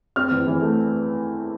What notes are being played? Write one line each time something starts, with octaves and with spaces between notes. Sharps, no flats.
C4 F6
E2
E3
A3